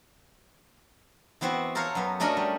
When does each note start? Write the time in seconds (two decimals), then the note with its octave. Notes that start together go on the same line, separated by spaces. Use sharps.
1.41 E3 B3 C4 E4 F#4
1.75 A4 A#4 C5 C#5 F5
1.95 F#2 B3
2.20 F#3 A3 C#4 D4 A#4 D#5
2.37 G3